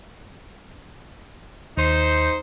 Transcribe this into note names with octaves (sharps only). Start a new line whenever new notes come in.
D#2 D#4 C5